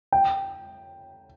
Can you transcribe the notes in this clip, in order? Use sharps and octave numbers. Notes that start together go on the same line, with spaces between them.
G5